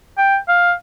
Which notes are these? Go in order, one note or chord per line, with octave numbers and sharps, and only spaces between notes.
G5
F5